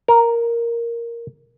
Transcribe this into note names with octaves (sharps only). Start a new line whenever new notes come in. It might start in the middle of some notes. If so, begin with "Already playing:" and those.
A#4